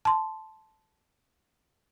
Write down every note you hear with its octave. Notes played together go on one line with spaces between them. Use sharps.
A5 C6